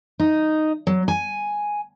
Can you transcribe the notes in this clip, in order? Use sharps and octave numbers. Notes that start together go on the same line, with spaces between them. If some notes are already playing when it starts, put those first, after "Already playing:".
D#4
F#3
G#5